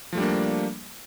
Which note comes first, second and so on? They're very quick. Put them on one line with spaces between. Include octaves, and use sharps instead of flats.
F3 A3 G3 D4 A#3